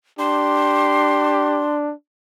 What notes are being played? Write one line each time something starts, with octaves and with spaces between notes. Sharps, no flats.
D4 G4 C6